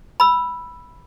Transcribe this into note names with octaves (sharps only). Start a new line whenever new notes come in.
B5 E6